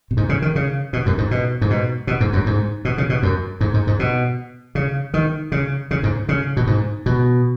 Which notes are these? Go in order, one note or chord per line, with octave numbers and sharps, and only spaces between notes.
B2
G#2
C#3
D#3
C#3
B2
F#2
G#2
B2
G#2
B2
B2
G#2
F#2
G#2
B2
C#3
B2
F#2
G#2
G#2
G#2
B2
C#3
D#3
C#3
C#3
G#2
C#3
B2
G#2
B2